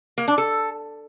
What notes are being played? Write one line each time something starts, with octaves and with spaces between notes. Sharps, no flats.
A#3
D4
A4